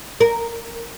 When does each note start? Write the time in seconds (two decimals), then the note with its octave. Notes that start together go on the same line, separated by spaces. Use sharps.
0.20 A#4